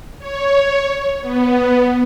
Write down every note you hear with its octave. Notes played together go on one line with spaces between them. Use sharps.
C#5
B3